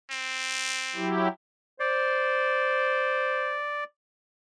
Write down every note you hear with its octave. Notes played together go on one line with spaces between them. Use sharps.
C4
F#3 E4 G4
C5 D5